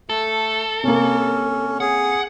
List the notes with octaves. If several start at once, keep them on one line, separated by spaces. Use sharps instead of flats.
A3 A4
C3 A#3 C#4
G#4 F#5